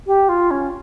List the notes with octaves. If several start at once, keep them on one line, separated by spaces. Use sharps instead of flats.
G4
F4
C#4